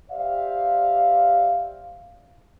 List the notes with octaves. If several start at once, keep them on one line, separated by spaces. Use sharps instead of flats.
G4 C5 D5 E5 F5